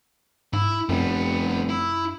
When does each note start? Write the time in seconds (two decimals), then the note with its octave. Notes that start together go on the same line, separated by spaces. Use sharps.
0.53 G#2 E4
0.89 F1 F#2 G3 B3
1.69 E4